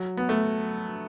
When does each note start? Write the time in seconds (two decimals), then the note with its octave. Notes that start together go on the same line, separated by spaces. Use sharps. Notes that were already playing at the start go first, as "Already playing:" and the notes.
Already playing: F#3
0.17 B3
0.29 A3